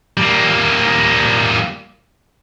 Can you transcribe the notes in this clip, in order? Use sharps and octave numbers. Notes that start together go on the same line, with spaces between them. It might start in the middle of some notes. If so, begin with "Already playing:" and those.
G3 A#3